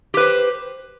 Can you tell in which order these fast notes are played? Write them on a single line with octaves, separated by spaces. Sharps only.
G4 B4 C5